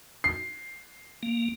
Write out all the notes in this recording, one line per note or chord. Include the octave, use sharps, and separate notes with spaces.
C7
A#3